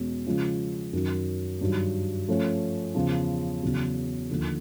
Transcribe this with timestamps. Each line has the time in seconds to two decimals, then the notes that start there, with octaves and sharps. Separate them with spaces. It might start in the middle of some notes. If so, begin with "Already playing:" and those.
Already playing: E2 B2 G#3 C#4 F#4
0.26 C#3 F3 G#3 C#4 F4
0.93 F#2 D#3 F#3
1.61 G2 D#3 F#3
2.28 F3 A3 C#4
2.95 E2 C#3 F3
3.62 E2 C#3 F#3
4.30 D#2 D3 F3